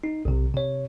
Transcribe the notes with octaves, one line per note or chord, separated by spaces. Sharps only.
D#4
B1 C3
C3 C#5